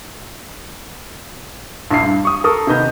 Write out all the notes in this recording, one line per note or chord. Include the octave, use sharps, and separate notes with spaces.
A#1 E4 C7
G2
C#6 D#6
A4 A#4 C#6 D#6
C3 D#3 B3 D#5 G6